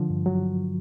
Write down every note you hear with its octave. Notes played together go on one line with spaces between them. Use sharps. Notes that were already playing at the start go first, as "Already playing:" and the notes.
Already playing: D3 F3
G2
F#3